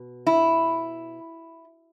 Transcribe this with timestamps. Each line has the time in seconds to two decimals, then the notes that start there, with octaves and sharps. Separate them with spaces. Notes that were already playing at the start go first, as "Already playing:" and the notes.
Already playing: B2
0.27 E4